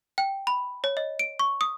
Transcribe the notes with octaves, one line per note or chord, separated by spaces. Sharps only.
G5
B5
C#5
D#5
D7
C#6
D#6